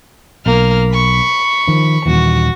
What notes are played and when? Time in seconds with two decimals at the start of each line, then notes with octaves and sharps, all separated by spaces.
0.46 B1 A#3 F6
0.92 B5 C#6
1.68 D#3 F3
2.06 D#1 D#2 E3 F#4